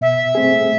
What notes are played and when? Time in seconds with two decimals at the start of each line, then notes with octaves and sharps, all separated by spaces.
0.01 B2 E5
0.35 A3 C4 G#4